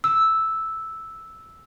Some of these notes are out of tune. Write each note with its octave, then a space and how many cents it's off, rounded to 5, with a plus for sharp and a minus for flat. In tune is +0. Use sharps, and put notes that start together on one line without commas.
E6 -5